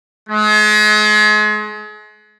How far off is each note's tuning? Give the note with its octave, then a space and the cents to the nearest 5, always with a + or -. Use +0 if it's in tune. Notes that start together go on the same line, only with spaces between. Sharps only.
G#3 +35